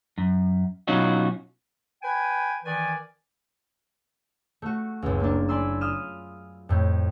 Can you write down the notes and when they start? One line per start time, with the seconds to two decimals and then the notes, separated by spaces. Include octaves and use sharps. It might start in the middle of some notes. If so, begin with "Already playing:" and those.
0.18 F#2
0.88 B2 F#3 C#4 D#4 F4 F#4
2.02 B4 G5 G#5
2.64 D#3 E3 D5 G#5
4.62 A3 F#4
5.02 F#1 C#2
5.20 A#3 D4
5.49 D5 G#5 B5 C6 E6
5.81 F4 D#6 F6 E7
6.69 F2 A2